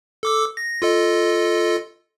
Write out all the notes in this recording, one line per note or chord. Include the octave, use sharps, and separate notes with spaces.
A4 D6 E6
A#6
F4 A4 D#5